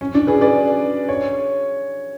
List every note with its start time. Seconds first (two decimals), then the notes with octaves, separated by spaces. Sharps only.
0.01 C#4
0.15 D4
0.27 G#4 B4
0.41 B4 D5
1.09 C#5